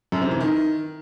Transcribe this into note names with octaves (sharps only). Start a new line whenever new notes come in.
F#2
C3
E3
D#3